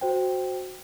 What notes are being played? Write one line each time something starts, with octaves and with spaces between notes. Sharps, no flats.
F#4 C5 G5